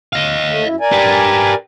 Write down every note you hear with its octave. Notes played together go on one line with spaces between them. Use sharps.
D#5 F5
A3
F#2 E4
A#4 D5 G#5
G4 B4